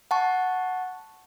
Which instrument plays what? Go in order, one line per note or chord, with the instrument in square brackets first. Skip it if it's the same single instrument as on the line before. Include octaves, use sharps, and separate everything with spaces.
[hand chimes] F#5 A5 C#6